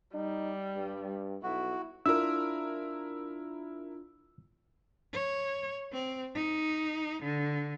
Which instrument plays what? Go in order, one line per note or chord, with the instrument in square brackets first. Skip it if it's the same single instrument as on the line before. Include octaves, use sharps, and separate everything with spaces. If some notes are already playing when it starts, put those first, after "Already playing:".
[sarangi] G3 [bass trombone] D#4
[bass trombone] G2
[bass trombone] B1 [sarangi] E4 [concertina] F#4
[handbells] D4 F4 [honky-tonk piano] E4 A#4 [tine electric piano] E6
[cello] C#5
C4
D#4
D3